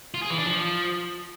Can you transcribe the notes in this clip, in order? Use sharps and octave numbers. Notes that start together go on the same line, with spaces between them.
F4
G#4
E3
D4
F3